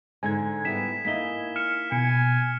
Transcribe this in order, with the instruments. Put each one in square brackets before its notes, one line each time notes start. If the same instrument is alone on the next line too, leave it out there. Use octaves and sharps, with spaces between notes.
[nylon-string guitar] G#2 D3 [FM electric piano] G#5 G#6
[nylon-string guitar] G3 B3 E4 [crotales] B6 E7
[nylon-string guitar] A#3 D#4 E4 [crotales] B6 G7
[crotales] F6 C#7 E7
[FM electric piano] B2 [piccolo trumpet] G#5 [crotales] C#7